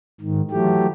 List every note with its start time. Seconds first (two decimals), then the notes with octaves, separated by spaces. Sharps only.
0.21 G#2 D#3
0.51 E3 F#3 A3 G4